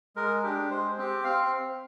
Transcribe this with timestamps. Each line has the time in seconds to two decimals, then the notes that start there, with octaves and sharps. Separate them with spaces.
0.16 G#3 A#4
0.43 D4 G4
0.70 G#3 C5
0.98 C4 G4
1.24 C4 F5